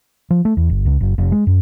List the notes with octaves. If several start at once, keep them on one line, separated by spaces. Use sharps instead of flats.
F3
A3
E2
G1
C#2
F#1
F1
G#3
F#2